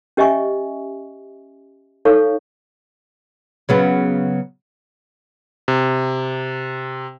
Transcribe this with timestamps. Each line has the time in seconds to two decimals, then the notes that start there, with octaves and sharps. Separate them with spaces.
0.17 C#4 G4 D#5 E5 G#5 C#6
2.05 D#4 A4 C#5 F5 C#6
3.69 C#3 F#3 B3
5.68 C3